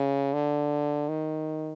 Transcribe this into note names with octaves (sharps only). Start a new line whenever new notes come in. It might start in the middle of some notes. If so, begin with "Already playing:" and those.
Already playing: C#3
D3
D#3